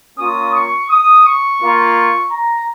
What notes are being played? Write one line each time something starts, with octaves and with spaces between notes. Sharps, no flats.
A#3 C#4 F4 D#6
C#6
D#6
C#6
A#3 F4
A#5